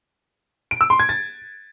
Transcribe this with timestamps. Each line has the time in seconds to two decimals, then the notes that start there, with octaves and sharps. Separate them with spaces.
0.71 D7
0.81 E6
0.90 C6
1.00 G#6
1.09 A6